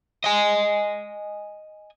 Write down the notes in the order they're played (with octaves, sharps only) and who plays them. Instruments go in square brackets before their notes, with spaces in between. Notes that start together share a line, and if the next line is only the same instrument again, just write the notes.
[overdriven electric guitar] D#5 G#5